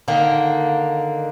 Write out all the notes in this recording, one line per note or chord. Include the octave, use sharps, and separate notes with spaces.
D3 D#3 A#3